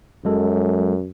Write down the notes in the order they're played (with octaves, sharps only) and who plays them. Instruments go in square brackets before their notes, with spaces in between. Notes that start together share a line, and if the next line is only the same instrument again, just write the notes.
[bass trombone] F#2 [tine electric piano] F#3 G#3 A4